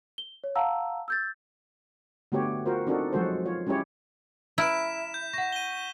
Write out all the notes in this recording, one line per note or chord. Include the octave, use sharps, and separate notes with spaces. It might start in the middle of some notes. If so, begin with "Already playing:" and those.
G7
C#5
F5 F#5 A5 A#5 E6
E6 G6 A6
D3 A3 B3 F#4 G4 C#5
F4 F#4 A#4 C5
C4 D4 D#4 F#4 A4 A#4
F3 F#3 G#3 F#4 A4 C5
F4 C#5
G#3 C#4 E4 G4 C#5
E4 A#5 F6 B6 D7 E7
G6
F#5 C#6 A#6
D#7 G7